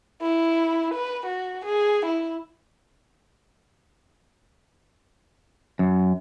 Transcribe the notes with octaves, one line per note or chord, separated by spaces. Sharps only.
E4
B4
F#4
G#4
E4
F#2